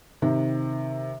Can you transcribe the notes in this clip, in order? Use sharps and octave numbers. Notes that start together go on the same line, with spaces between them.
C3 D#3